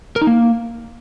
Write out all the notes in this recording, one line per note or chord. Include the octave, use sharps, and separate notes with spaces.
A#4
D#4
A#3